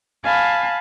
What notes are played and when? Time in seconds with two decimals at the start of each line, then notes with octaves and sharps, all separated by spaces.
0.23 F5 G#5 A5 B5